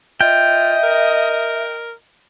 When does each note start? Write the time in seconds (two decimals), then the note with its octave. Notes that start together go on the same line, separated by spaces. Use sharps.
0.21 F4 D#5 E5 G5
0.84 A#4